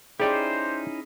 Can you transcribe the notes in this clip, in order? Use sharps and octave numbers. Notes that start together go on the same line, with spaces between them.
C#4 D#4 E4 G4 G#4 C5 D5 G5